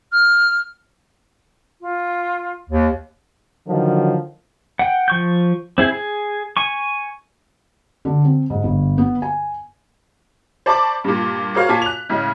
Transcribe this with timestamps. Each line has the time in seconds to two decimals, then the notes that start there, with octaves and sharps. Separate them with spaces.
0.12 F6
1.81 F4
2.69 D#2
3.68 D3 D#3 F3 F#3
4.79 F#5 G5
5.08 F3 C#6 G6
5.78 C4 E4 G#4
5.92 G#4
6.57 G#5 C#6
8.05 D3
8.25 C4
8.50 G#2
8.64 G1
8.98 B3
9.22 G#5
10.66 C5 D5 A5 B5 C#6 D6
11.04 G2 A#2
11.55 F#4 G#4 A#4 C5 C#5 F5
11.69 A#2 C#5 G#5 A5 B6
11.82 F#6 F7
12.09 A2 C#3 G#3